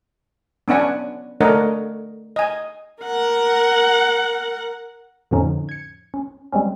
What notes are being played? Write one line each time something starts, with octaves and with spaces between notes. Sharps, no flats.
B3 C#4 D4 F#5 G#5
A3 D4 A#4 C#5 D#5 F#5
D#5 G#5
A#4 F#5
F2 A2 D3 F3 C#4 D#4
G#6 C#7
C#4
G3 G#3 C4 C#4